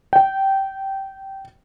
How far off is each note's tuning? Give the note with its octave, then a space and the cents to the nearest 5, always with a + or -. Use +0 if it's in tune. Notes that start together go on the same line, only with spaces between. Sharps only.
G5 -15